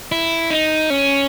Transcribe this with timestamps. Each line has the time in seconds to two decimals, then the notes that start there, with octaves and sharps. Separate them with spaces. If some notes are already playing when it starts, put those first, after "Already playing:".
0.12 E4
0.50 D#4
0.90 C#4